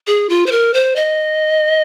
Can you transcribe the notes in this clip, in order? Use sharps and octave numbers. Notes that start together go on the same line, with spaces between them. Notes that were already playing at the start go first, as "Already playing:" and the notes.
G#4
F4
C5
A#4
C5
D#5